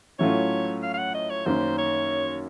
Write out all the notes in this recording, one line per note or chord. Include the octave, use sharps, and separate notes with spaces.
A2 F#3 A3 C#4 F4 C#5
F5
F5
F#5
D#5
C#5
F#2 D#3 A#3 C#4 C5
C#5